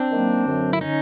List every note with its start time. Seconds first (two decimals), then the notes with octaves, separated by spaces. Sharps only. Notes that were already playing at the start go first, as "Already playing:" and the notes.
Already playing: C4 D4
0.10 D#3 F#3 A#3
0.46 F#2 D3 F#3
0.73 E4
0.81 D3 F#3 C#4 D#4